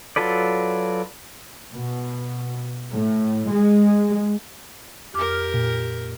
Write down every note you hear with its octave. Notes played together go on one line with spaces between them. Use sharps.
F#3 F4 A4 B4 D5
B2
A2
G#3
F2 G4 A#4 D6 F6
A#2